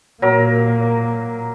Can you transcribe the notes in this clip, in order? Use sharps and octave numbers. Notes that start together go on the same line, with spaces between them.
A#2 F#3 A#3 A#4